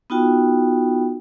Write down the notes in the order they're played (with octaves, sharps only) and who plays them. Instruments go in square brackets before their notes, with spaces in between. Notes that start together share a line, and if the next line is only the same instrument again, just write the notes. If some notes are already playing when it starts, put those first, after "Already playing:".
[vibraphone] B3 D#4 F4 F#4 G5